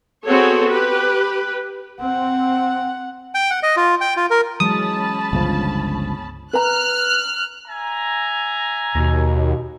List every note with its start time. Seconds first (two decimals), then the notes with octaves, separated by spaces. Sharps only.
0.25 B3 C4 F#4 G#4 A4 C#5
0.68 G4 B4
2.01 C4 F#5
3.35 G5
3.51 F#5
3.63 D#5
3.77 F4
4.01 G5
4.17 F4
4.30 A#4
4.60 E3 F#3 G#3 C#4 A5 B5 D#6
5.33 G1 C#2 F3
6.53 B4 A#5 F6 F#6
7.67 E5 G#5 A#5
8.95 D#2 B2